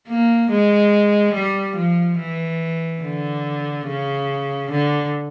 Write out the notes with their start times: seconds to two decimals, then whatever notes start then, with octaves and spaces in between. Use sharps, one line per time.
0.08 A#3
0.50 G#3
1.34 G3
1.76 F3
2.19 E3
3.02 D3
3.86 C#3
4.71 D3